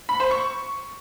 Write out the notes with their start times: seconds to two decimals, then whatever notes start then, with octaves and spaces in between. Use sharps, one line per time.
0.09 B5
0.20 C5
0.31 C#6